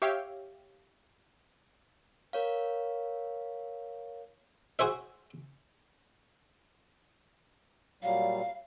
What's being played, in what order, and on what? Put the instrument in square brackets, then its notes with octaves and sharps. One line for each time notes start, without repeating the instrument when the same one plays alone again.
[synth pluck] G4 C#5 E5 F5 G5
[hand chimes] A#4 C#5 F5
[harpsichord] F#4 G#4 C5 E5
[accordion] A#2 F#3 G3 [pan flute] F5